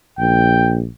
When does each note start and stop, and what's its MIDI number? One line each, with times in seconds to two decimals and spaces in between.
0.19 0.86 34
0.19 0.75 79